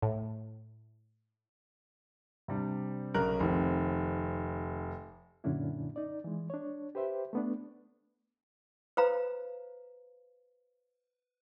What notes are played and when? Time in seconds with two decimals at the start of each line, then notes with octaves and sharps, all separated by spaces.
0.02 A2
2.48 C3 G3 D4
3.14 B1 C#3 A#4 F#6
3.40 F1 D#3 C4
5.44 F#2 A#2 D3 C#4 D4 E4
5.96 D#4 D5
6.24 E3 G#3
6.50 D4 C#5
6.95 G4 B4 C5 E5
7.33 A3 B3 D4
8.97 B4 C5 F5 A#5